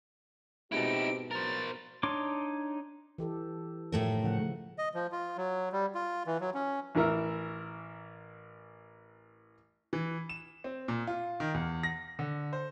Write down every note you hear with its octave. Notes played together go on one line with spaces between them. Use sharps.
G#2 B2 C4 D#4 E4 G4 D7
F#3 A#4 C5 A6
D4 D#4 C#5 C6 D6
E3 G4 A4
A2 D#3 F3 A3 A#4
C#3 F3 F#5
D#5
F3
F4
F#3
G3
F4
E3
F#3
C#4
A1 E3 A#4 E5
E3
E7
C4
A#2
F4
D#3
E2
A#6
D3
C5